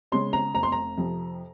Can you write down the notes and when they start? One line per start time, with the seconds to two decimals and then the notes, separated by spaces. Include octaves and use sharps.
0.12 C#3 G#3 C#4 C6
0.33 A#5
0.54 F1 A#5
0.63 C6
0.72 A#5
0.97 F2 C3 F3